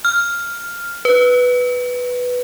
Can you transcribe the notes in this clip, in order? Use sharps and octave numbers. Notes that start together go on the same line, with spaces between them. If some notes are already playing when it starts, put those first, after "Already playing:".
F6
B4